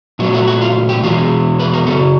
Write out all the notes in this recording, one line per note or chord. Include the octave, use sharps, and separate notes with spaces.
A#2 F#3 A3 F#4
F#4
F#4
F4
G4
E2 B2 G#3 F4
B4
A#4
F#2 C#3 F#3 A4